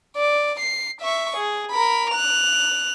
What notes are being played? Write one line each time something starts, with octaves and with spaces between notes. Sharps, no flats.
D5
C7
E5 C#6
G#4
A#4 B5
F#6 F7